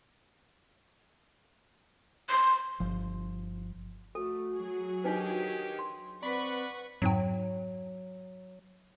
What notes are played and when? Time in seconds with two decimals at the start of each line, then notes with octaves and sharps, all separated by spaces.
2.30 C6
2.80 G1 F3
4.15 A3 F#4 A4
4.53 F#3 G#4
5.04 D#3 D4 D#4 G4 B4
5.79 C6
6.22 C4 B4 D5 F#5 B5 C#6
7.02 F2 G#2 F#3 G5